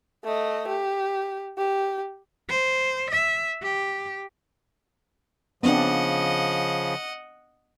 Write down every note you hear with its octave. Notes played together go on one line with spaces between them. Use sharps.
A3 D#5
G4
G4
C5
E5
G4
C#3 F3 B3 C4 D4 D#5 F#5